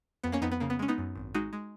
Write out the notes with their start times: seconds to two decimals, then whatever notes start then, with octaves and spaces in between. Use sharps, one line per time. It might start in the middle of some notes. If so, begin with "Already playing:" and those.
0.23 F2 B3
0.32 A#3 C#4
0.41 F2 B3 D#4
0.52 B3
0.60 C#3 A#3
0.70 B3
0.79 G#3 C#4
0.88 B3 D#4
0.98 F#2
1.15 G#1
1.34 G#3 D#4 F#4
1.53 G#3